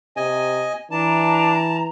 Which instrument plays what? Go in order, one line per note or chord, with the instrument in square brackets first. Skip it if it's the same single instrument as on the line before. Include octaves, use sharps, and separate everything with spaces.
[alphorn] C3 [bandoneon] D#5 G#5
[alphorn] E3 [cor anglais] D4 [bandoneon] A5 [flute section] A#5